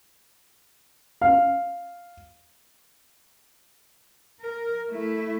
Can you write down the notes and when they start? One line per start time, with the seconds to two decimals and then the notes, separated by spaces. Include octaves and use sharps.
1.22 F5
4.41 A#4
4.90 A3 E4